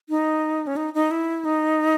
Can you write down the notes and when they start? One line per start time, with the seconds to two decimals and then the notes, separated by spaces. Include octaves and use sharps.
0.09 D#4
0.67 C#4
0.76 D#4
0.94 D#4
1.11 E4
1.45 D#4